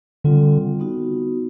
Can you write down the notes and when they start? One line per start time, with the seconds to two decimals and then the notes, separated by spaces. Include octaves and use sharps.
0.24 D3 G3 C4 F4
0.80 B3 D#4 F#4